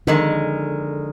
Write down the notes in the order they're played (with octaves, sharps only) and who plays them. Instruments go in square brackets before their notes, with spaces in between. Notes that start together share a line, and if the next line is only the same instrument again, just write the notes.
[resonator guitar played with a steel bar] F2 D#3 G#3 [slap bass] D3